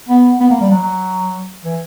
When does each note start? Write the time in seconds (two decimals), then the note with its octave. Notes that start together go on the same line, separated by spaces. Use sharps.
0.09 B3
0.40 B3
0.50 A#3
0.61 G3
0.71 F#3
1.65 E3